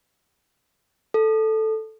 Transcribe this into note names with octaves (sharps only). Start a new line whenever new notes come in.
A4